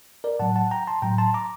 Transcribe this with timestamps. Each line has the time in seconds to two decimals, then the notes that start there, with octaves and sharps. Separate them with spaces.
0.24 A#4 D5
0.39 A2 F#3 F#5 A5
0.56 F#5 A5
0.71 G5 A#5
0.87 A5 C6
1.02 A2 F#3 G5 A#5
1.18 A5 C6
1.34 A#5 D6